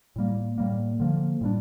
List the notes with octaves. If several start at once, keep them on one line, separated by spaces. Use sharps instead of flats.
A2 G3 A#3
A2 G3 A#3
D3 F3 A#3
A2 G3 D4